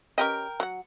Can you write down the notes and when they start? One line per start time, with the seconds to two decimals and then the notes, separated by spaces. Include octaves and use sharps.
0.18 C#4 G4 A#4 D#5 G5
0.60 F#3 F#5